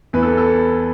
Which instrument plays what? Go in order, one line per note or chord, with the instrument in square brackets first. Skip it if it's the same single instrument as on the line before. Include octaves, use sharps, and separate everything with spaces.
[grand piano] E2 E3 B4
A4
A4